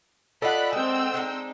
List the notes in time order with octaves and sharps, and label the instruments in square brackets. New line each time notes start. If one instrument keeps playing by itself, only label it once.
[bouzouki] D4 F4 [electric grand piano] A4 D#5 F#5 [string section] B5 F#6
[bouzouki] G#3 [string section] C4 G5 E6
[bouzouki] G#3 D4 D#4